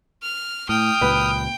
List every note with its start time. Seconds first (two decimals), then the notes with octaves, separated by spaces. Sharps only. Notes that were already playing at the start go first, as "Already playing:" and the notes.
0.23 F6
0.69 A2 G5 D#6 F6
1.01 C#2 A#2 B4